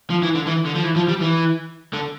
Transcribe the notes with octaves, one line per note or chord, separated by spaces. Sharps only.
F3
E3
D3
E3
D3
F3
E3
F3
G3
E3
D3